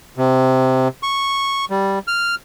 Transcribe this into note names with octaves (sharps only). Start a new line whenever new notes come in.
C3
C#6
G3
F6